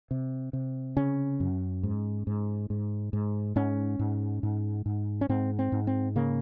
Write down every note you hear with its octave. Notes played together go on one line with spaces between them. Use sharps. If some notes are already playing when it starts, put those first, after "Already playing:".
C3
C3
C#3 C#4
F#2
G#2
G#2
G#2
G#2
G#2 C#4
G#2
G#2
G#2
C#4
G#2 C4
C4
G#2
C4
C#3 A#3